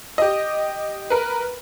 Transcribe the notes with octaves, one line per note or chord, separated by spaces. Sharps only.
G4 D#5
A#4 B4